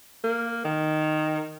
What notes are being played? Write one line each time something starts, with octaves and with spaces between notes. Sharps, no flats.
A#3
D#3